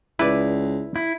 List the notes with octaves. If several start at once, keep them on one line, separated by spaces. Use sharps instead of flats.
C#2 E4 B4 D5
E4